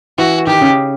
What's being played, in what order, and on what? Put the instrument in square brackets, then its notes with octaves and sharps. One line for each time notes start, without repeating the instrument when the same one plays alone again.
[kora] E3 [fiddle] F#4
[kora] D#3 [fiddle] G4
[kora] C#3